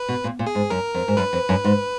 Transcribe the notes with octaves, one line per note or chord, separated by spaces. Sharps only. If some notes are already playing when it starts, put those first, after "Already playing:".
Already playing: B4
B2
A#2
A#2
G#4
G#2
F#2 A#4
F2
G#2
F#2 B4
F2
F#2
G#2